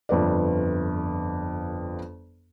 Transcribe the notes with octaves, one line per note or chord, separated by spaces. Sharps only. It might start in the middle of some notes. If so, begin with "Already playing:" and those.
G1 F2 B4 D5